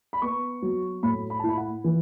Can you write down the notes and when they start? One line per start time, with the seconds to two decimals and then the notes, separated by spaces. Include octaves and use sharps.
0.13 B5
0.22 B3 C#6
0.62 F#3
1.03 A2 B5
1.30 B5
1.39 A5
1.44 E4
1.49 B5
1.57 F#5
1.84 E3